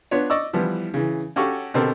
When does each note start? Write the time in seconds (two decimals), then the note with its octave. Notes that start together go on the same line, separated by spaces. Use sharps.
0.11 B3 D4 F4 C#5
0.30 D5 D#5 C#6 E6
0.53 E3 F3 G3 B3 E4
0.94 C#3 E3
1.36 C#4 F#4 G4 A4 F5 C#6
1.74 B2 D3 C4 G4 A4 A#4